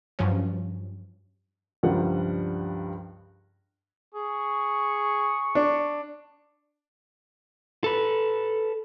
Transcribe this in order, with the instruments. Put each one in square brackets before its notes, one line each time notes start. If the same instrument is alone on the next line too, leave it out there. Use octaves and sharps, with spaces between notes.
[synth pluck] G2 F3 F#3 C#4
[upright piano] C#2 G2 F3 G3 A#4 F#5
[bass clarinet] G#4 [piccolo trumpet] C#6
[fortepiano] D4
[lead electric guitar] A4 B4